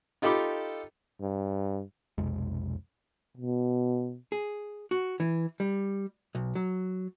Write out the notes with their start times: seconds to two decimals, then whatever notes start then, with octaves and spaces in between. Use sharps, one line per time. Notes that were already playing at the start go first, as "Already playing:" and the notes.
0.22 D#4 F4 G4 A4 B5 D6
1.21 G2
2.18 B1 F2 C3 G#3
3.37 B2
4.32 G#4
4.91 F#4
5.20 E3
5.60 G3
6.35 B1
6.55 F#3